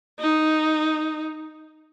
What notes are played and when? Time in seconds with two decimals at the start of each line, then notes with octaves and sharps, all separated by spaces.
0.19 D#4